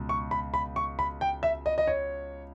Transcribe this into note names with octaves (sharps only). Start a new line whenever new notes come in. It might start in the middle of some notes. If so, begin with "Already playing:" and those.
Already playing: C#2 B2
C#6
B5
B5
C#6
B5
G5
E5
D#5
D#5
C#5